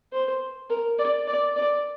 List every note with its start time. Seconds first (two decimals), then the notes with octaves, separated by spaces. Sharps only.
0.13 C5
0.70 A#4
0.99 D5
1.27 D5
1.56 D5